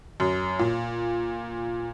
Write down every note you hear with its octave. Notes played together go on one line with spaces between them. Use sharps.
F#2
A#2